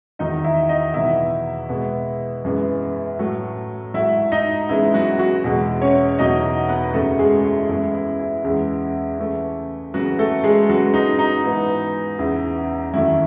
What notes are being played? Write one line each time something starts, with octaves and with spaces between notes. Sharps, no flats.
E2 D#3 F#3 D#4 D#5
E4 E5
D#4 D#5
E2 B2 F#3 B3 E4 E5
B2 G#3 B3
F#2 E3 G#3 B3
A2 F#3 A3
G#2 F#3 A3 E4 E5
D#4 D#5
C#3 E3 G#3 B3 E4
F#3 F#4
F#3 F#4
E2 B2 G#3 B3
C#4 C#5
E2 B2 F#3 A3 D#4 D#5
B3 B4
F#2 C#3 F#3 A3 A4
G#3 G#4
E4
F#2 E3 G#3 B3 E4
E4
E4
E2 C#3 G#3 B3
C#3 E3 A3
C#3 E3 F#3 B3 F#4
A3 A4
G#3 G#4
C#3 F#3 G#3 B3 F#4
D#4
D#4
G#2 E3 B3
E2 C#3 E3
F#2 D#3 F#3 A3 E4